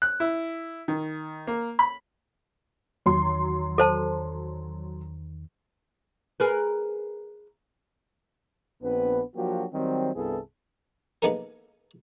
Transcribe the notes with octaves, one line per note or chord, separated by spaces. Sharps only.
F#6
E4
D#3
A#3
B5
E2 D#3 F#3 C6
A4 C5 A5
G#4 A#4 B4
A#1 B3 C4 D4 B4
F3 F#3 A#3 D4 F#4 G4
D#3 F#3 G3 C4
C2 G2 B3 E4 G#4 A4
G#3 A#3 B3 D#4 A4 A#4